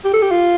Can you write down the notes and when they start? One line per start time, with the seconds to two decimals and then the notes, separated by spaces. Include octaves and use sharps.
0.05 G4
0.14 A4
0.22 G4
0.31 F4